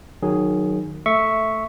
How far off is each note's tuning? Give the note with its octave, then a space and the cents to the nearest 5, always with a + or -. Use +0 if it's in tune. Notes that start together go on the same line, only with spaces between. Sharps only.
D#3 -20 F#3 -5 G#4 +0
A3 +5 E5 +0 C#6 +0